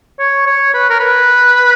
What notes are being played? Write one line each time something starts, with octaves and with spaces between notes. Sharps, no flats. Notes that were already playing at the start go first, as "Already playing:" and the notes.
C#5
C#5
B4
A#4
B4